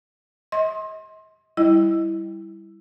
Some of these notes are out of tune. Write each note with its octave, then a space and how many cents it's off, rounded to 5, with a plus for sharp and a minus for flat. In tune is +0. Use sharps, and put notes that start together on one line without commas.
D#5 +40 C6 +25
G3 +0 E4 +0 D#5 +0